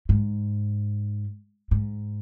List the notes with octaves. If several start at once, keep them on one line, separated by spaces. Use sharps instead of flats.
G#2
G#2